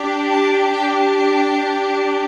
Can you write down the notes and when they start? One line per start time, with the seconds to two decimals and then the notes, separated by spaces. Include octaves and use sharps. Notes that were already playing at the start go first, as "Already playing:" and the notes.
Already playing: D4 G4
0.31 A5
0.73 G5